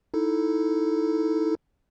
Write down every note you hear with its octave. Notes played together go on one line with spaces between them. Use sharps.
D#4 E4 A4